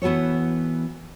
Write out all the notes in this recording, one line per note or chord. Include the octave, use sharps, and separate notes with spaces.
E3 B3 F#4 A4 C#5